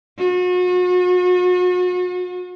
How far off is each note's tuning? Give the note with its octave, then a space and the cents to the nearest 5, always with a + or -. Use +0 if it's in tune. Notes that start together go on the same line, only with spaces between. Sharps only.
F#4 -40